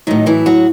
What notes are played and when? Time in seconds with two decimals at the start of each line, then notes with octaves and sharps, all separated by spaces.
0.07 A2 D#3 F#3 D#4
0.26 E3 E4
0.46 F#3 F#4